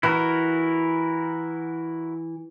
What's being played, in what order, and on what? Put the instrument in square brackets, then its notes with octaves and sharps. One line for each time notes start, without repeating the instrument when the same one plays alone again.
[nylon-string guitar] E3 [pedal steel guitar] E4 F#4 A#4